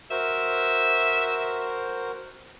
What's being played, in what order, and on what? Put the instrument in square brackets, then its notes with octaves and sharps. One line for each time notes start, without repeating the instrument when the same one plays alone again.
[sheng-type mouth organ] F#4 A#4 C5 [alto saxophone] E5